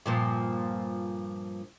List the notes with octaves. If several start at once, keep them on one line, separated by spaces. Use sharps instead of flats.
G2 A#2 F3